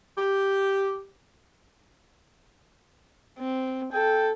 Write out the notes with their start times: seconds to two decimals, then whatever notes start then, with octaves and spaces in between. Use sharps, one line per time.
0.18 G4
3.39 C4
3.93 A4 G5